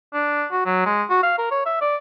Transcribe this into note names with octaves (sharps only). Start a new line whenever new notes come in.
D4
F#4
F#3
G#3
F#4
F5
A#4
C#5
E5
D5